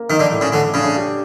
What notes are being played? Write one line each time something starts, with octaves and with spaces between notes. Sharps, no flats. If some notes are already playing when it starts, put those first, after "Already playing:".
Already playing: A#3
D#3 D#4
D3
A2
C#3
D3 A3
C#3 D4
G4